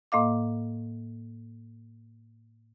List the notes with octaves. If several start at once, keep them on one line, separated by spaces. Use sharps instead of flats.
A2 A#3 D#5 F5 D6